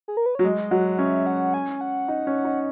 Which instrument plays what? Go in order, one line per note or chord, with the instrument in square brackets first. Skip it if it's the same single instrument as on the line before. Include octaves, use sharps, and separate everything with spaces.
[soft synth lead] G#4
A#4
B4
C#5
[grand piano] F#3
[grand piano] G#3 [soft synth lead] D#5
[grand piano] F#3 [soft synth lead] F#5
[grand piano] C#4 [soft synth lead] E5
[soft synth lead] F#5
G#5
F#5
[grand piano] D#4
C#4
D#4